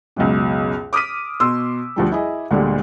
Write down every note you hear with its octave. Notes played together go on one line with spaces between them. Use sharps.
C#2 F#2 B2
D6 D#6 F6 B6 D#7
B2 C6 E6
D2 F3 G3
E4 G#4 D#5
D2 A#2 D3 G3 G#3